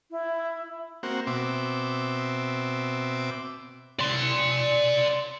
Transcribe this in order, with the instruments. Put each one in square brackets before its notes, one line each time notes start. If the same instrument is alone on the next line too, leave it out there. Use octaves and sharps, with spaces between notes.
[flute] E4
[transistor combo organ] A#3 C4 F#4
B2 C4 E5 D6
[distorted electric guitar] D5 C6